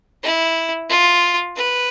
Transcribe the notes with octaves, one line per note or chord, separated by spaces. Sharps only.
E4
F4
B4